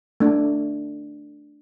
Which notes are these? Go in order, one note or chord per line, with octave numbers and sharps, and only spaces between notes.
A3 D4